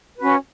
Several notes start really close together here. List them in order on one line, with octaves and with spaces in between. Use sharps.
B4 F#4 C#4